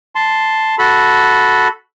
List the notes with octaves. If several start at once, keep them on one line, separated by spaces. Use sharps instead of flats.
A5 C6
F#4 A4 B5